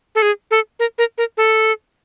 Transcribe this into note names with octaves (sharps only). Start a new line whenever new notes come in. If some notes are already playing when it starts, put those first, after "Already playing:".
A4
G#4
A4
A#4
A#4
A#4
A4